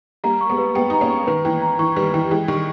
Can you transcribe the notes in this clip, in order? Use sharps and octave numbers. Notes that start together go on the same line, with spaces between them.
G3 A#3 A#5
C#6
G#3 B3
B4
G#3 B3 G5
D#4 A#5
A#3 C#4
C#6
D#3 B4
E3 G5
A#5
E3 C#6
D#3 G3 B4
E3 G5
E3 G#3 G5
D#3 G3 C#6